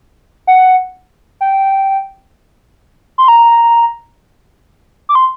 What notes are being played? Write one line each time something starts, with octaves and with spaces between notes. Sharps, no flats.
F#5
G5
C6
A#5
D6
C6